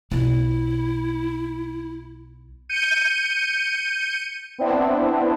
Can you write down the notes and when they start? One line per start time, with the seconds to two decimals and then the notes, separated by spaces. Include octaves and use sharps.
0.11 B1 E4 F4
2.69 G6 C#7 D#7
4.58 B3 C4 D4 E4